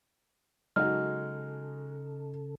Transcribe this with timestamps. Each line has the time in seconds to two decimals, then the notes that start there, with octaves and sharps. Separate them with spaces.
0.76 C#3 F#3 G#3 D#4 F#4 A4 F6